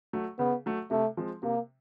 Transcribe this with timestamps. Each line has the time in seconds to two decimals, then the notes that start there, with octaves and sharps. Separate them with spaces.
0.13 F#3 A3
0.39 C#3 B3
0.66 F#3 A3
0.91 C3 A3
1.17 F3 G#3 C4
1.43 C3 A#3